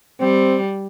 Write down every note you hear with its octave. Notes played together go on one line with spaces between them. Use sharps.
G3 C4